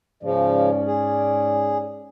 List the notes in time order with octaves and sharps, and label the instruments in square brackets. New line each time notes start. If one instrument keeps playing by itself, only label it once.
[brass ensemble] G#2 C#4 D5 [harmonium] C#3 F3
[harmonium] G#4